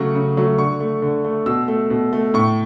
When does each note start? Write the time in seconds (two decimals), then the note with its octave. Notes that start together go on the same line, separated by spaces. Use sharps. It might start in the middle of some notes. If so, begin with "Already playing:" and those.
Already playing: C#3 F#3 A3 C#6
0.15 C#3
0.37 F#3 A3
0.58 D3 C#6
0.80 A3
1.02 D3
1.24 A3
1.46 B2 E6
1.68 A3
1.90 B2
2.13 A3
2.34 A2 C#6